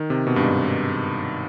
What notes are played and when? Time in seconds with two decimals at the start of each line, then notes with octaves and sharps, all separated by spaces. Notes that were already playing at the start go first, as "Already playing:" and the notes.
Already playing: D#3
0.10 C3
0.27 B2
0.36 G2
0.43 G#2